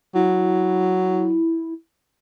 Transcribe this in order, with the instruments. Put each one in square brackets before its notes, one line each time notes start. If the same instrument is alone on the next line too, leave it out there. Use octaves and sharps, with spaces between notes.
[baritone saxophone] F#3 [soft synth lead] E4